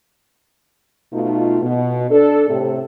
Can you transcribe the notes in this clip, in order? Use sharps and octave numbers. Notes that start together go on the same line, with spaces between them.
B2 A3 D#4 F4
B2
D4 A4
A2 C3